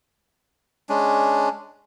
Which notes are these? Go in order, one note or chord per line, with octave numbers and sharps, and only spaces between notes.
G#3 C#4 D4